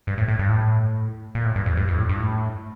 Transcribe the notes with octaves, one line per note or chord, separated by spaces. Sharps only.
G2
A2
A2
G2
A2
A#2
A2
G2
F2
G2
F2
A2
G2
A2